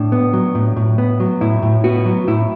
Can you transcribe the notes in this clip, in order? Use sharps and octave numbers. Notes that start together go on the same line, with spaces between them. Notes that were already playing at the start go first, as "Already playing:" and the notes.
Already playing: A2 D4
B3
F#3
A2
A2
B3
F#3
A2 E4
A2
B3 F#4
F#3
A2 E4